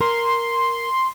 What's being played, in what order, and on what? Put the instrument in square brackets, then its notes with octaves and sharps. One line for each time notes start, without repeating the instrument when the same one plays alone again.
[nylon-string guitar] A#4 [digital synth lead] C6